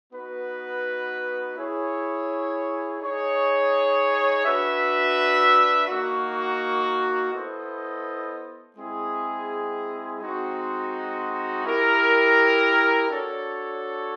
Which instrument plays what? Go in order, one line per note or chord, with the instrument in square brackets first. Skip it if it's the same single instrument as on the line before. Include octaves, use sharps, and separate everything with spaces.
[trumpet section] B3 D#4 F#4 B4
E4 G#4 C#5
D#4 G#4 C#5
D4 F#4 B4 E5
A#3 D#4 F#4
B3 E4 A4 C5 D#5
G#3 C4 E4 G#4
G#3 C4 D#4 F#4
E4 G4 A#4
D4 F#4 A4 C#5